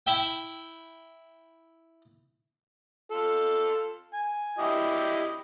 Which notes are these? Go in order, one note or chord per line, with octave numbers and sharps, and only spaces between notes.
E4 E5 G5
F4 A4
G#5
E4 G4 D#5